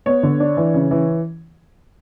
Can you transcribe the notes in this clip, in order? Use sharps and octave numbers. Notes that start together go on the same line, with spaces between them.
B3 C#5
D3
D4
E3
C#3
E3